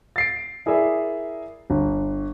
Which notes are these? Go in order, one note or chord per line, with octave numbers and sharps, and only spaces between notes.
A6 C7 D7
E4 G#4 A#4 D5 E5
G1